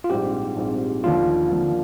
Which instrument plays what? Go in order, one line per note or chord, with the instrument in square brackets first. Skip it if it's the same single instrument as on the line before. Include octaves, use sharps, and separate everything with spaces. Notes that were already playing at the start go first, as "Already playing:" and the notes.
[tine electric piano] F4
[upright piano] A#1 G#2 G3 C4 [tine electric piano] G4
[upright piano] A#1 G#2 G3 C4
[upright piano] D#2 D3 F3 A#3 D4 [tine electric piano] F4
[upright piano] D#2 D3 F3 A#3 D4